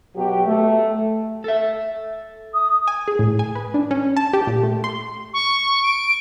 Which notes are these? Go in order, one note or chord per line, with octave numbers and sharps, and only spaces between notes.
B2 F#3 G4
A3
A4 E5
D#6
G#5
G#4
A2
G#5
B4
D4
C#4
A5
G4
A#2
A3
C6
C#6
D7